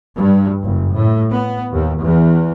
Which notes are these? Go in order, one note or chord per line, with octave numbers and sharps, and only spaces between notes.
G2
F#1
A2
B3
D#2
E2